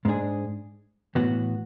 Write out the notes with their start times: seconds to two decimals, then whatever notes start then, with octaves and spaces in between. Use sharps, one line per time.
0.05 G#2 G#3 D4 G#4
1.15 A2 E3 B3 F#4